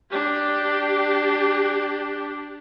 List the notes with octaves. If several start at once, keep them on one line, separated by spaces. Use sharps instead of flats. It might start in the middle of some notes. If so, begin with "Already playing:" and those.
D4 G4